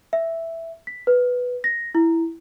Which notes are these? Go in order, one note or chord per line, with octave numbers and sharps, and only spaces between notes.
E5
B6
B4
A#6
E4